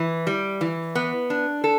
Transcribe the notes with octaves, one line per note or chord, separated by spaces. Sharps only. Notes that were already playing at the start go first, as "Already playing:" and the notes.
Already playing: E3
G3
E3
B3
D4
A4